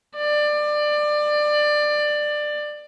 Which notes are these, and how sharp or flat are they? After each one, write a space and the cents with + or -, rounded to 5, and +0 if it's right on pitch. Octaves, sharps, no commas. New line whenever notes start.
D5 +20